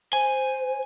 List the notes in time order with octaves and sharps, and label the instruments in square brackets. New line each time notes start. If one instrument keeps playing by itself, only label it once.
[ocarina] C5 [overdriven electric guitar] G#5